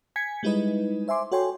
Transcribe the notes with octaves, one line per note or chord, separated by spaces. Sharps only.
G#5 G#6 B6 C#7
G3 G#3 D#4 E4 B4 D#5
C5 E5 G#5 C6 D6
F#4 A4 C#5 G5 G#5 C6